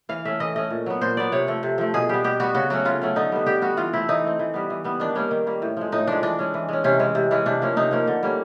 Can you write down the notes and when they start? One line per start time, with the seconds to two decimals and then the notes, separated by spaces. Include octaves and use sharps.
0.09 E3 F5
0.25 A3 C#4 E5
0.40 E3 D#5
0.56 A3 C#4 D#5
0.70 A#2
0.86 F#3 B3
1.01 A#2 C5
1.17 F#3 B3 D5
1.32 C3 C#5
1.47 F3 A3
1.63 C3
1.78 F3 A3
1.94 B2 G#4
2.09 G3 B3 G4
2.24 B2 G4
2.40 G3 B3 F#4
2.55 C#3 F#4
2.70 F#3 A3 C#4 F#4
2.85 C#3 F4
3.01 F#3 A3 C#4
3.16 D3 D#4
3.32 G3 B3
3.46 D3 G4
3.62 G3 B3 F#4
3.77 E3 F4
3.93 A3 C4 E4
4.09 E3 D#4
4.24 A3 C4
4.39 E3
4.54 G3 B3
4.70 E3
4.84 G3 B3
5.00 D#3 D4
5.15 G3 A#3 C#4
5.31 D#3
5.47 G3 A#3
5.62 A2
5.77 F3 G#3
5.92 A2 D#4
6.07 F3 G#3 D4
6.23 E3 D4
6.39 G#3 C#4
6.54 E3
6.68 G#3 C#4
6.84 C3 C#4
6.99 E3 G#3 C#4
7.15 C3
7.31 E3 G#3 C#4
7.46 C3 D4
7.62 F3 A#3 C#4
7.76 C3 D#4
7.91 F3 A#3 C#4
8.07 D3
8.23 G3 A#3 C#4